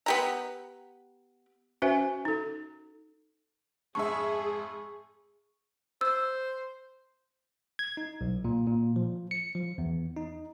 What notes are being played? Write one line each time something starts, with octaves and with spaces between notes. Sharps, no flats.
B3 G4 A#5
C#4 F#4 B4 C5 E5 G#5
D#4 A4
F2 G#2 G#4 E5 C#6
C5 E6
G#6
D#4
B1
A#2
A#2
F3
C#7
F3
E2
D#4